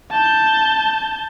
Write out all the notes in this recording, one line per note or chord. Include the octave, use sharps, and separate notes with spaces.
A5 G6